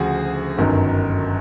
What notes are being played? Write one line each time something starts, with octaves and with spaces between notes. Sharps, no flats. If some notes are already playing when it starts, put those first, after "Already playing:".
Already playing: D2 C#3 F3 F#4 G#4
G1 F#2 D#3